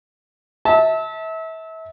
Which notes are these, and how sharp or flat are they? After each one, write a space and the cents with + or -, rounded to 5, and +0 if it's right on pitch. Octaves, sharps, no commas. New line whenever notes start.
E5 -30 A5 +0